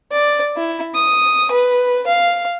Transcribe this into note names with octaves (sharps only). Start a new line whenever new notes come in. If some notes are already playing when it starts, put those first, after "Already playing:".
D5
E4
D#6
B4
F5